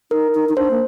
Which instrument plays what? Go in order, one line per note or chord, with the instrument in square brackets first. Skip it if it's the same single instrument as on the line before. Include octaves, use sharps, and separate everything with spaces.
[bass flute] D#4 [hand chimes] A#4
[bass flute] D#4
D#4
[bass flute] D4 [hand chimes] C5
[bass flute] A#3